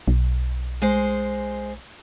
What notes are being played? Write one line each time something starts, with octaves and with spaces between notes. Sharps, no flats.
B1
G#3 C5